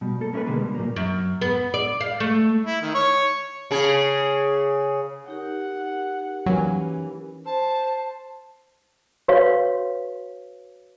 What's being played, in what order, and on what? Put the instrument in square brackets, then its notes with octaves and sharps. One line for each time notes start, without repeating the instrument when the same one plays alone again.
[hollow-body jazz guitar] B2 G3
A#3 A4
A#3 C#4 E4 F#4 A#4 B4
B2 D3 G#3 A#3 B4
G3
A#2 F#3 A#3
[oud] F#2
B3
D5
F5
A3
[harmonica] E4
D#3
C#5
[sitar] C#3 G#4
[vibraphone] D#4 G4 A#4 [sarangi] F#5
[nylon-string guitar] E3 A#3 C#4 [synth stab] F#3
[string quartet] C5 [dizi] A5
[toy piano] F#4 B4 C#5 F5